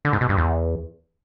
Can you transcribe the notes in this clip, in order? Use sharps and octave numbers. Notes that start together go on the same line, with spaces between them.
D3
G#2
B2
G2
E2